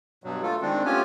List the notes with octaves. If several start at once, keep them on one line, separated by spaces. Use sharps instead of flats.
G2 B2 F#3
A3 A#3 F4 A4
D#3 G#3 C4 D4
A3 B3 C#4 F4 G4 G#5